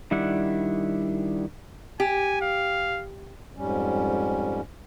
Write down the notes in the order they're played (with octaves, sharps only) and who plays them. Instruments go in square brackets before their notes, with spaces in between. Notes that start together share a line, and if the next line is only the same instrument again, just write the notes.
[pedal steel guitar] D#3 G3 D4 E4 F#5
[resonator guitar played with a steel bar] G4 [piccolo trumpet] G#5
[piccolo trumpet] F5
[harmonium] F2 G#2 G3 C#4